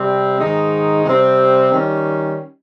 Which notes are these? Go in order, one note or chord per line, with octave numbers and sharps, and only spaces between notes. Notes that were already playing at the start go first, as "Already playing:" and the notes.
Already playing: C3 G3 C4
G#2 D#3 G#3 D#4
C3 G3 C4
D#3 G3 C#4